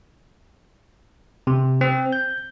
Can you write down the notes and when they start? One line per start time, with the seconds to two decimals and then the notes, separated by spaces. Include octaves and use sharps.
1.47 C3
1.81 C4
2.13 G6